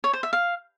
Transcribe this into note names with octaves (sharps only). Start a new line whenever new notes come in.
C#5
C5
E5
F5